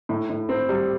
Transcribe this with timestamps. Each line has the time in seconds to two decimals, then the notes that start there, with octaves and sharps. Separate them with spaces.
0.09 A2
0.30 A2
0.49 C4
0.69 G3